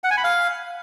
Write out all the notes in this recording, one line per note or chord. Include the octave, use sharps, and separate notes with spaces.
F#5
G#5
B5
F5